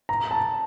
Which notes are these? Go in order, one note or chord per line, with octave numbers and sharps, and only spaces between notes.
A#5
A5